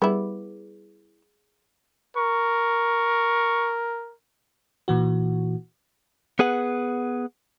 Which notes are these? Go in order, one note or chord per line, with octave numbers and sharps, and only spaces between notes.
G3 B3 E4 G#4
A#4 C#6
A#2 E3 F#4
B3 G#4 B4 F#5